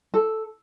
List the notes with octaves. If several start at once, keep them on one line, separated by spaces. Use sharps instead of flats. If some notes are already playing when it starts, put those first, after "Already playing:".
A4